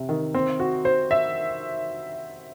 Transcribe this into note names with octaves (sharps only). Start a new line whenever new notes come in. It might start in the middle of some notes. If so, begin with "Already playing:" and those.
Already playing: C3
D#3
C4
F#4
C5
E5